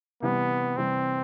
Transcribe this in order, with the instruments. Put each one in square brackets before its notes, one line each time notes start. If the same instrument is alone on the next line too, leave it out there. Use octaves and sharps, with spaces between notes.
[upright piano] C3 E3 G3 [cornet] B3
[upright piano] C3 E3 G3 [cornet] C4